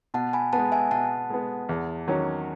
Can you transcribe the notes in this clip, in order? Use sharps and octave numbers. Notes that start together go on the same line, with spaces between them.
B2 F#5 A5
G#5 B5
G#3 B3 F#5 A5
E5 G#5
B2 F#5 A5
G#3 B3
E2
D#3 F#3 C#4